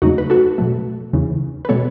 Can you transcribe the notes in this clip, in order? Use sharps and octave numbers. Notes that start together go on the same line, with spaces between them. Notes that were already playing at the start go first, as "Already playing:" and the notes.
E2 C#3 F#3 A3 D#4 F#4
B4
F#4 A4
B2 F#3 A3
E2 C#3 E3
B4
B2 G#3 B3 A4 C#5